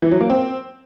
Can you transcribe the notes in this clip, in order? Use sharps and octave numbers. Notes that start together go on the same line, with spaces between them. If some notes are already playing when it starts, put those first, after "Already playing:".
E3
F#3
A#3
C4